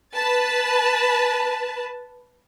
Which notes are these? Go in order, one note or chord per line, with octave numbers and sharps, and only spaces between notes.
B4 A5